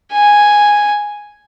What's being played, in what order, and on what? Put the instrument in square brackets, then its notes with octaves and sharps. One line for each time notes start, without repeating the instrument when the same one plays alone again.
[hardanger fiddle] G#5